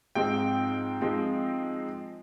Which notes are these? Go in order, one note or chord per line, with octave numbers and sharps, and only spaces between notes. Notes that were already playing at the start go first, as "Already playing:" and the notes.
G#2 F3 G#3 C4 D#4 G5
F3 G#3 C4 D#4